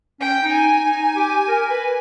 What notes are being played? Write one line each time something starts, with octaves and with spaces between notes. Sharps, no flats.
C#4 G5
D#4
G#5
D#4
D#4
G4
A#4
B4